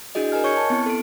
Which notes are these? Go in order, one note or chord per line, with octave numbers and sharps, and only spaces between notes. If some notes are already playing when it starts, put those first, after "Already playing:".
D4 E4 F#4 G#4 D#5
A#4 D#5 G#5 F6
C#5 C#6 G6 G#6 C#7
A5
B3 C4 E4
A4 D7